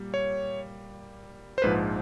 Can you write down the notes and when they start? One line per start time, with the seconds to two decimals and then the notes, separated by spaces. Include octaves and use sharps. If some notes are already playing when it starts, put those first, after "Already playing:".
Already playing: A#2 G3 A#3
0.14 C#5
1.58 C5
1.62 A#1 G#2 F3 B4